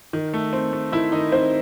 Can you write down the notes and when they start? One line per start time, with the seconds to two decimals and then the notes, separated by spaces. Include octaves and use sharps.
0.13 D#3
0.34 A3
0.53 C4
0.73 A3
0.92 D#3 E4 E5
1.12 D#3 D#4 D#5
1.32 D#3 C4 C5